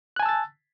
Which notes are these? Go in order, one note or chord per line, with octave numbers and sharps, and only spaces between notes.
G#5 A5 E6 F#6 A6